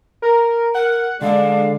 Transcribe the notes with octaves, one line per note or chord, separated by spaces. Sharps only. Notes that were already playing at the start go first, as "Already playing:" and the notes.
A#4
A#4 F#5
D3 G#3 D4 F5